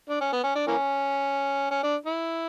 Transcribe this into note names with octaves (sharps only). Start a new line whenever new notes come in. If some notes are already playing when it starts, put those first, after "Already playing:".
D4
C#4
B3
C#4
D4
E3 A#3 C#4
C#4
D4
E4